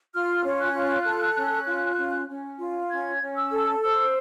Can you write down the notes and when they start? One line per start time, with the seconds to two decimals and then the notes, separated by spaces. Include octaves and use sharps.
0.13 F4 F6
0.44 C#4
0.60 F#6
0.74 F4
1.05 A4
1.36 C#4
1.67 F4
1.98 C#4
2.28 C#4
2.59 F4
2.90 C#4 G#6
3.21 C#4
3.36 E6
3.51 A4
3.82 C5 E6